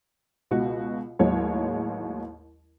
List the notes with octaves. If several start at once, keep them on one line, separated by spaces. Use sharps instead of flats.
C#2 B2 F#4
A1 D#2 F#3 G#3 C#5